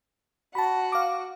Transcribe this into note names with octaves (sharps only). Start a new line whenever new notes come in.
F#4 A5 B5
F5 D6